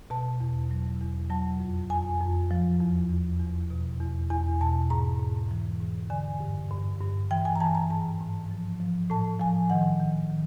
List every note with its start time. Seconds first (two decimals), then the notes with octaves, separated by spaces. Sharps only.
0.10 B2 A5
0.40 E2
0.71 F#3
1.00 E2
1.30 F#3 A5
1.60 F2
1.90 F2 G#5
2.20 F2
2.51 F3
2.81 E2
3.10 E2
3.40 E2
3.70 B2
4.00 E2
4.30 E2 G#5
4.61 B2 A5
4.90 G#2 A#5
5.20 G#2
5.51 E3
5.80 G#2
6.10 D3 G#5
6.40 G2
6.71 G2
7.00 G2
7.31 E3 G5
7.45 G#5
7.56 A#5
7.60 E3 A5
7.75 A#5
7.90 G#2 A5
8.20 G#2
8.51 F3
8.80 F3
9.10 A2 A5
9.40 F3 G#5
9.70 D#3 F#5
10.00 D#3
10.30 D#3